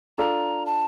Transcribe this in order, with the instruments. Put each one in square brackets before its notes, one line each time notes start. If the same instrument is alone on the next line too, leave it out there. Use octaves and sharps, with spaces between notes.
[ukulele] D4 F4 A4 D5 [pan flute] A#5
[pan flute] A5